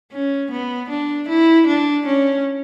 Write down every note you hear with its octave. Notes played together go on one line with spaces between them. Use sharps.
C#4
B3
D4
E4
D4
C#4